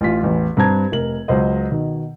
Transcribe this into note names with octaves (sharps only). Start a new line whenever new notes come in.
A1 F4 B6
A1 E2
G2 C4 A5 A#5 G#6
F1 A#4 F#7
C#2 F#3 C5 D#5
B2 D#3